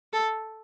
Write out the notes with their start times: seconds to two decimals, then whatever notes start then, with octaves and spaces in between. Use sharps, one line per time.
0.13 A4